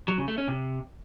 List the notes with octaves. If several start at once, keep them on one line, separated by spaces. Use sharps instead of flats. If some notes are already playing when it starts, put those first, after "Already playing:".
F#3
C#3
A3
C#4
C3